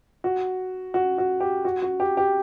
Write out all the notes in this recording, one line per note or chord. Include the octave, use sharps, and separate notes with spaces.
F#4
F#4
F#4
G4
F#4
F#4
G4
G4